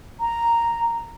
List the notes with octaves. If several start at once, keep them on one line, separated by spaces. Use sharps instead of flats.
A#5